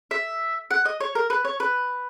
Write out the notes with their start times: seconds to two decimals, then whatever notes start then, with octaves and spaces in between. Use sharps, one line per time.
0.11 E5
0.71 F#5
0.85 D#5
1.00 C#5
1.15 A#4
1.30 B4
1.45 C#5
1.60 B4